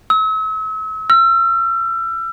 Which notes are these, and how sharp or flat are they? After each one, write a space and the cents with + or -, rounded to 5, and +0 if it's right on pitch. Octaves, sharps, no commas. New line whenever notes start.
E6 -40
E6 +40